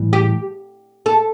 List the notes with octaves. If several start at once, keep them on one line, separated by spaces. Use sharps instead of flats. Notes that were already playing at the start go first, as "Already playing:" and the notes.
Already playing: A2 E3 G3
G4
A4